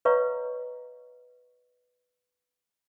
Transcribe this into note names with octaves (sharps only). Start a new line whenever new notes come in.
B4 C#5 D#5 F5 A#5 C#6